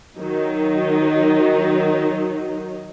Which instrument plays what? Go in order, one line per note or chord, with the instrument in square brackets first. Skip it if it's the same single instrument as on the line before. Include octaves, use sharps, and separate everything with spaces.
[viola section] D#3 F#3 D#4